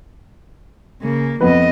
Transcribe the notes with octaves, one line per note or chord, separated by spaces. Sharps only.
C#3 A#3
F2 F3 B3 B4 D#5